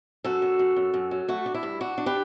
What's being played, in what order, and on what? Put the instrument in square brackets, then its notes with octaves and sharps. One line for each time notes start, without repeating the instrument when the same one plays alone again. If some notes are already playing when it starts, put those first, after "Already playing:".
[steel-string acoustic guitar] F#2 F#4 A4
F#2
F#2
F#2
F#2
F#3
A3 F#4
D4
E4
G2
D4 F#4
D4
G4 B4